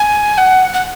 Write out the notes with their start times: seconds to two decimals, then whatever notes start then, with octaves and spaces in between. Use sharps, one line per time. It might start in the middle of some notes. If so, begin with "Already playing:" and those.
Already playing: G#5
0.38 F#5
0.73 F#5